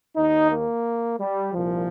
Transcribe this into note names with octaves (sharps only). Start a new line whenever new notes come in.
D#2 D#3 D#4
A#3
G3
C2 A#2 F3